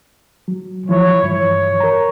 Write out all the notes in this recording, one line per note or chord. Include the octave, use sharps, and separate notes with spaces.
F#3
E3 F3 E4 C#5
G2 E3 C#5
A#4 A#5